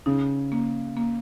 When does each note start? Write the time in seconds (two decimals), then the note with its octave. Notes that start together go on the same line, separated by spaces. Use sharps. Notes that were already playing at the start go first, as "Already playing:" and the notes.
0.06 C#3 D#4
0.52 A#3
0.97 A#3